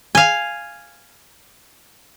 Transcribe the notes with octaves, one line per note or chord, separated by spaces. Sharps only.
F5 G#5